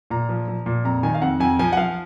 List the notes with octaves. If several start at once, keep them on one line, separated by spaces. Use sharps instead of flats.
A#2 A#5
F3
F3
A#2
F2 A#5
D#3 G#5
F5
F2 F#5
F2 G#5
F3 G#5
F#5
F3 F5